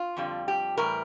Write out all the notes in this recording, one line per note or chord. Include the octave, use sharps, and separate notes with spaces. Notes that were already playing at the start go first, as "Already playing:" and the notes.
Already playing: F4
F2 D3 G3
G4
A2 E3 G3 A#4